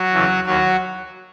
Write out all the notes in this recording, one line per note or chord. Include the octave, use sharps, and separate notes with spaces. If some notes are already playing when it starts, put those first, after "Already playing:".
Already playing: F#3 F#4
E2 C#3 E3
D#2 F#3 F#4